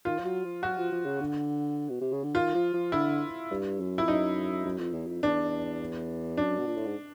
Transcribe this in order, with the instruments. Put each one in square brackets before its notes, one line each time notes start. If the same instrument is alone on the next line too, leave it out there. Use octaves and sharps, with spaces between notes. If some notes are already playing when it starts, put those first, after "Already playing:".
[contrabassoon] D#3 [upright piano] F4
[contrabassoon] F3
F#3
F3
[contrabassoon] F#3 [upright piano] F#4
[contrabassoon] F3
F3
C#3
D3
B2
C3
C#3
D3
[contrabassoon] D#3 [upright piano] F4
[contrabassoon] F3
F3
[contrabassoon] D3 [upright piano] E4
[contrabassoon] G2
F#2
[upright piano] E4
[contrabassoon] F2
[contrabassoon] F#2 [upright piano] D#4
[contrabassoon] F#2
F2
E2
F2
[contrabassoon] E2 [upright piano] D4
[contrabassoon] F#2 [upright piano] D4
[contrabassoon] B2
A#2
A2
G#2